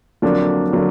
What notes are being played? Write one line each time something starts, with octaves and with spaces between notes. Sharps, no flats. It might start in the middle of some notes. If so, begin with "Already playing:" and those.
F2 D3 F#3 A#3 D4
D3 F#3 A#3 D4